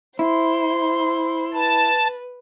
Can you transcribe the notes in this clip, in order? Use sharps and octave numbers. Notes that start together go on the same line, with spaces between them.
E4 C5 C6
B4 A5